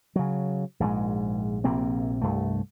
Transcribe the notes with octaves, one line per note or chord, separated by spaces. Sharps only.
C#3 F#3
A#1 G#2 F3 G#3
A#1 C3 A#3 C4
C2 G2 A3